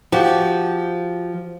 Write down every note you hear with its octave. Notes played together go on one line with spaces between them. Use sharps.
F3 F#4 G4